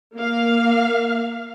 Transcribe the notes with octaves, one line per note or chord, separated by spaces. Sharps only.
A#3 F5